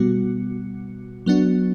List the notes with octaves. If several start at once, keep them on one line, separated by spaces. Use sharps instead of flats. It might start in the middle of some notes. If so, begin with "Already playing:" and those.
Already playing: B2 G3 B3 F#4
F#3 B3 D4 F#4